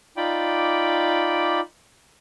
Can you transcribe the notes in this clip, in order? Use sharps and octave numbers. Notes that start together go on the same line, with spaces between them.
D#4 F4 D5 G5 B5 D6